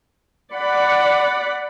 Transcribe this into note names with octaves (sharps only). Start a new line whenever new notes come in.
D5 F#5 B5